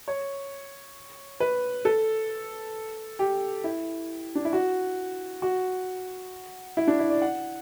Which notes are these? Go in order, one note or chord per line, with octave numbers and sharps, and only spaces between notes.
C#5
B4
A4
G4
E4
D4
E4
F#4
F#4
E4
D4
E4
D5
F#5